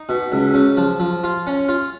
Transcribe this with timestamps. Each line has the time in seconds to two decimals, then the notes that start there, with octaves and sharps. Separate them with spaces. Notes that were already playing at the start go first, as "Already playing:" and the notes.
Already playing: D#4
0.09 B2
0.32 C#2
0.54 C#3
0.77 F3
1.00 F3
1.24 F4
1.47 C#4
1.69 F4